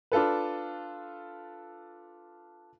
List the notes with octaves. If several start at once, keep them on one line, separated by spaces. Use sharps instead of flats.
D4 F4 A4 B4